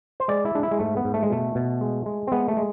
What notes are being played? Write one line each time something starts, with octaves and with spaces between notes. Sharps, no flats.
C5
G#3 D5
E4
G#3 D4
E4
G#3
G#2 A3
B3
G#2
A3
G#3
B2 A3
B2
G#3
G#3
C4
G#3 B3
A3
G#3